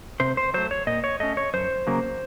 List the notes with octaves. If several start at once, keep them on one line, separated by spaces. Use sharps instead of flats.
C3 C5
C5
F#3 A3 C5
C#5
A#2 D#5
C#5
A3 C#4 D#5
C#5
F#2 C5
C#3 F#3 A#3